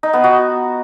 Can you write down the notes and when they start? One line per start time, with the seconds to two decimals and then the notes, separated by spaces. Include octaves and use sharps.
0.03 D#4
0.13 B3
0.24 F#4